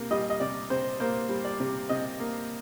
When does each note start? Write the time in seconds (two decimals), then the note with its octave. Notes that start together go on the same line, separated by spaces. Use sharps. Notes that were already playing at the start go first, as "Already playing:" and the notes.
Already playing: C3 A#3
0.11 G3 D#5
0.30 D#5
0.40 C3 D5
0.70 C3 C5
1.00 A#3 C5
1.29 G3
1.45 D5
1.60 C3
1.89 C3 D#5
2.20 A#3